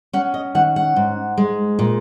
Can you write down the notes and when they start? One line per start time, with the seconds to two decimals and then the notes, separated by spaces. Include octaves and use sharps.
0.13 C#4 F#5
0.34 D#5
0.55 D#3 F#5
0.76 F#5
0.96 G#2
1.38 G#3
1.79 A#2